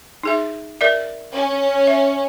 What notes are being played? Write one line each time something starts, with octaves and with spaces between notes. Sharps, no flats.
D#4 G#4 E5
A#4 D5 E5
C#4
E5